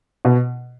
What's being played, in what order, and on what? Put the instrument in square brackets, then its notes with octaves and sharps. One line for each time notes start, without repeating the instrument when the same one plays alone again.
[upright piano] B2